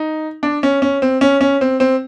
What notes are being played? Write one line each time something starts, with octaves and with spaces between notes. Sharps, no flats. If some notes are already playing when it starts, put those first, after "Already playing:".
Already playing: D#4
D4
C#4
C#4
C4
C#4
C#4
C4
C4